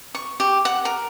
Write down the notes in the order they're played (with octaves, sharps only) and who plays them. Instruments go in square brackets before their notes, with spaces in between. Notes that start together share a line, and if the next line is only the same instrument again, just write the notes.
[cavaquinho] C#6
G4
F#5
A#4